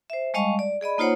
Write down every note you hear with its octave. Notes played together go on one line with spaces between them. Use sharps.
C5 E5
G3 G#3 D#5 F5 A5 C#6
D5
G#4 D5 D#5 B5
A#3 D#4 F4 C5 C#5 F#5